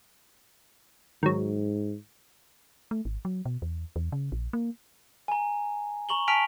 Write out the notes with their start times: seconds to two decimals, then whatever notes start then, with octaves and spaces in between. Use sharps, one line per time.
1.23 G#2 D#3 F#3
2.91 A3
3.05 G#1
3.25 F#3
3.45 B2
3.62 E2
3.96 E2
4.12 C#3
4.32 A#1
4.53 A#3
5.28 G#5 A#5
6.09 A#5 C#6 F#7 G7
6.28 G#5 A5 F6 B6 D7 F7